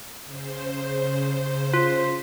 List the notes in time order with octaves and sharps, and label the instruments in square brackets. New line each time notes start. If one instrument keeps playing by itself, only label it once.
[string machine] C#3 C5
[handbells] F4